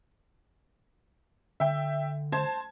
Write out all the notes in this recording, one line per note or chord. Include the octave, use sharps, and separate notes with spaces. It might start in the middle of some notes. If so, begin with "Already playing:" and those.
D3 E5 G5
C5 A5 G#6